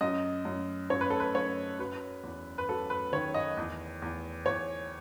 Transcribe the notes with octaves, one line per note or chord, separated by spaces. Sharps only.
F#2 D#5
F#2
F#2 C#5
B4
A4
B4
F#2 C#5
F#3 B4
E2
B4
F#3 A4
B4
D#3 C#5
D#5
E2
E2
E2 C#5